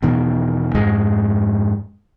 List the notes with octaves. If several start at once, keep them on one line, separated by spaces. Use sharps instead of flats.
E2 B2 D#3
F2 G#2 G#3